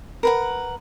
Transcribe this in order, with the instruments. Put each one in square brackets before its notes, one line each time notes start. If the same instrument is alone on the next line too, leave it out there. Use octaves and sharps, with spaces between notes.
[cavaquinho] A#4 B4 F#5